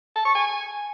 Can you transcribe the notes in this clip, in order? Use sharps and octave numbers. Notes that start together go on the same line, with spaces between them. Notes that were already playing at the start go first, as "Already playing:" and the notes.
A5
C#6
G#5